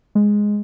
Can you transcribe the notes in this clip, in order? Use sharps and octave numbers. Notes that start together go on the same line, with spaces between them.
G#3